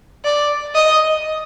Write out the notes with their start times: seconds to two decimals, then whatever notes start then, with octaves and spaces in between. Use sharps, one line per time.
0.25 D5
0.75 D#5